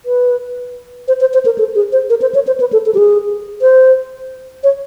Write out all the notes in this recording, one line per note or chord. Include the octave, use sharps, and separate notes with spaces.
B4
C5
C5
C5
A#4
A4
G#4
C5
A#4
C5
C#5
C5
B4
A4
A4
G4
G#4
C5
C#5